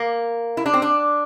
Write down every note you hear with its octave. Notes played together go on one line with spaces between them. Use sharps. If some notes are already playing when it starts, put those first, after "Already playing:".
Already playing: A#3
E4
D4
C4
D4